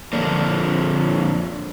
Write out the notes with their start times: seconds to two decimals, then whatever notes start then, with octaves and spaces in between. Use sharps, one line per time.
0.13 F2 D3 F3 A#3 D4